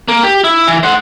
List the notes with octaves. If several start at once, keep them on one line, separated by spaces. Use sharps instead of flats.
A#3
G4
E4
E3
C5 F#5